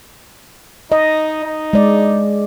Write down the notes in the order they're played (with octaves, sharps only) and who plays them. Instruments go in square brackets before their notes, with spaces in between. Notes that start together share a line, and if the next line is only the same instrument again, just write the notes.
[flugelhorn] D#4 [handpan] D#5
[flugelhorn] D#4
[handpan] G#3 D5